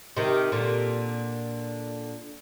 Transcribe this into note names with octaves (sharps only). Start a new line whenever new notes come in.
C3 D#3
A#2 D3